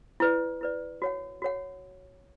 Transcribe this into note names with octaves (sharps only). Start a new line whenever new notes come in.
E4 B4 D5
E4 B4 D5
F#4 C#5 F#5
F#4 C#5 F#5